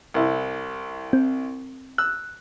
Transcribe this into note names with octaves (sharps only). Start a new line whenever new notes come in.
C2 E4
C4
E6 F#6